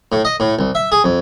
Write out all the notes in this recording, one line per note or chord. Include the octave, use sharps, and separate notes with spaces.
A2
D#5
A2
C2
E5
G#4
F2